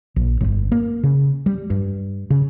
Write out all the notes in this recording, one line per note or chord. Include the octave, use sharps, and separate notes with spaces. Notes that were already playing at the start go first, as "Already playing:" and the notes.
A#1
G1
A#3
C#3
G3
G2
C#3